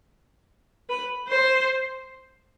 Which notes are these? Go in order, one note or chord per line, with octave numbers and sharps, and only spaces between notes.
B4
C5